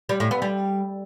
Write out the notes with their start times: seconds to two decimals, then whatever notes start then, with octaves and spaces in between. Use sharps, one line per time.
0.09 G3
0.20 A2
0.31 B3
0.42 G3